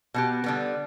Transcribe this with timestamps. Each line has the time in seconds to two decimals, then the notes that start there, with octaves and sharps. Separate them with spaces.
0.14 B2 B3 G4
0.44 D3 G3 B3